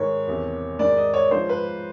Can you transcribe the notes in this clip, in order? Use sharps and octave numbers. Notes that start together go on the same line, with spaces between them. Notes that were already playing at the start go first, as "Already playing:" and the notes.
Already playing: G#2 D#3 C#5
E2 C3 D#3
G#2 D#3 D5
D#5
C#5
G#2 F3 C5
B4